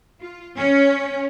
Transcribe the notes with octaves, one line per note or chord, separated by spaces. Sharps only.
F4
C#4